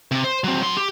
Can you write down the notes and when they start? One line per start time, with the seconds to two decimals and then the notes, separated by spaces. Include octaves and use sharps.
0.11 C3
0.24 C5
0.44 F#3 C4
0.61 F#3 C6
0.77 G4